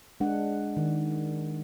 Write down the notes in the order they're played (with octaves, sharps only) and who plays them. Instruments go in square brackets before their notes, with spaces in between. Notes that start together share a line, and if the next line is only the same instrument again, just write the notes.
[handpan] G#3 D4 F#5
D#3